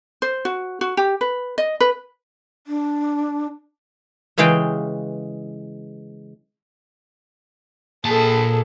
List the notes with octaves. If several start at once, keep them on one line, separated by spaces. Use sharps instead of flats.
C5
F#4
F#4
G4
B4
D#5
B4
D4
C#3 E3 G#3 F5 G5
A#2 G#4 A4 A5